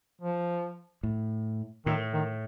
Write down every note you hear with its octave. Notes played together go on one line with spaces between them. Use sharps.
F3
A2
A2 D#3
D#3